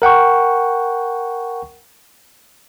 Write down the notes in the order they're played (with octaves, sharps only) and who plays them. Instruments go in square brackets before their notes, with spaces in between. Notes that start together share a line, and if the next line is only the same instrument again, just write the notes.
[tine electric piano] A#4 F#5 G5 C#6